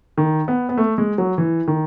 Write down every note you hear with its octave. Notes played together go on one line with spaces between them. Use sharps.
D#3
B3
B3
A3
G#3
F#3
E3
D#3